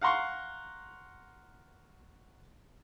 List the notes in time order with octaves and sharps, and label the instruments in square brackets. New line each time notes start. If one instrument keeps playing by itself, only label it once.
[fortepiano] F5 F#5 A#5 C6 C#6